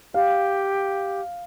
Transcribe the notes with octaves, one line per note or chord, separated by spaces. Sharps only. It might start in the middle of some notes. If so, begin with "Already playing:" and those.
G4 F5